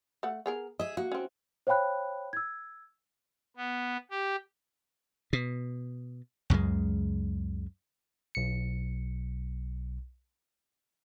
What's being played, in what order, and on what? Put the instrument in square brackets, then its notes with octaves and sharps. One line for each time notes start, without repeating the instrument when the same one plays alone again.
[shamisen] A3 F#5
B3 G#4 A#4
[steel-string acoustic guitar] G#4 E5 [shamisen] D#5
[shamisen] A#3 [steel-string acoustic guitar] F#4
[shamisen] C4 C#4
[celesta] C5 C#5 F5 G5 B5 F#6
E6 G#6
[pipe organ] B3
G4
[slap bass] B2
C#2 F#2 C#3 G#3
[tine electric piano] B1 C#7